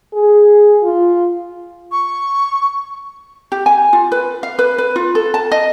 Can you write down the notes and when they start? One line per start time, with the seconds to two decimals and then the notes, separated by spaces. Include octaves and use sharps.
0.14 G#4
0.83 F4
1.92 C#6
3.52 G4
3.66 G#5
3.93 F4
4.12 B4
4.43 F5
4.59 B4
4.78 B4
4.96 F4
5.15 A4
5.34 A5
5.52 D#5